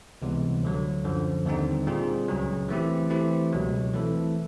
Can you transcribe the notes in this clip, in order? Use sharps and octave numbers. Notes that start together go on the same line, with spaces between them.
C#2 C3 E3 G3 B3
D2 D3 F#3
F#2 D3 F3
D#2 D3 G3 C4 D#4
A#2 G3 C4 F4 G#4
C#2 C#3 F#3
E3 A3 C4 E4 G4
E3 A3 C4 E4 G4
C#2 B2 F#3
E3 A3 C4 E4 A4